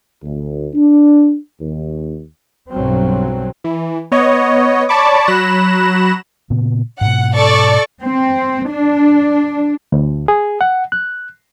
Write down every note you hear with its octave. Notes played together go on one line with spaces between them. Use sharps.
D2
D4
D#2
B1 G2 F#3 C4
E3
B3 C#5 D#5
C#5 D5 A5 B5 C#6 D6
F#3 B5 F#6 A#6 E7
A#2 C#3 B3
G#2 B2 F#5
A4 D5 C#6
C4
D4
D2
G#4
F#5
F#6